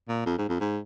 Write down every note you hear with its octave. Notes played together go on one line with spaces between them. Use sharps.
A#2
F2
G#2
F2
G#2